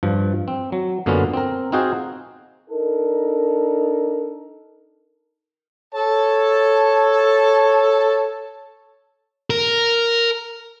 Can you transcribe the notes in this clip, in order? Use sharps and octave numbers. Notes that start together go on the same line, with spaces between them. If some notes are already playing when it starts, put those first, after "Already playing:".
G2 F3
C4
F#3
F#2 D3 A#3 B3 C#4 F4
C4 A#4
C4 D#4 F4 F#4 G#4 C5
D4 D#4 A4 A#4
A4 C#5 A5
A#4